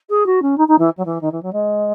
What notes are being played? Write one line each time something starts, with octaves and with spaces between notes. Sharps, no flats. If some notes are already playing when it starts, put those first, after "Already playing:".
G#4
F#4
C#4
D#4
D#4
E3
F#3
E3
D#3
E3
F#3
G#3